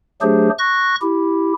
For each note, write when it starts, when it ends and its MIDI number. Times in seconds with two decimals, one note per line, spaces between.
0.22 0.50 54
0.22 0.50 57
0.22 0.50 62
0.22 0.50 67
0.22 0.50 68
0.22 0.50 72
0.59 0.96 85
0.59 0.96 90
0.59 0.96 94
1.02 1.53 64
1.02 1.53 67